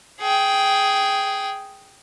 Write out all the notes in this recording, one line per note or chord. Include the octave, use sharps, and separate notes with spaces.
G#4 G5